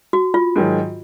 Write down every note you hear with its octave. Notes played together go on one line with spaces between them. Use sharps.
F#4
F4
G#2 D#3 F#3